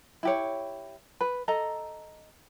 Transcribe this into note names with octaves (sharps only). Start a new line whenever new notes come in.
E4 G4 C#5
B4
A4 D#5 A#5